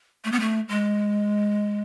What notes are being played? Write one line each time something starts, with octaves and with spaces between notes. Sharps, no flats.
A3
B3
A3
G#3